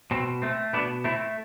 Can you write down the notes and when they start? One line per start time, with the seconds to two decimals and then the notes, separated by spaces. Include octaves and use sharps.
0.11 B2 C4
0.42 A3 C4
0.73 B2 B3 D4
1.04 A3 C4 E4